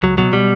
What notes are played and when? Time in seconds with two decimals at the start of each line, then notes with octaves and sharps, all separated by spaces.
0.03 C#2 F#3
0.18 B2 F#3
0.33 B2 G3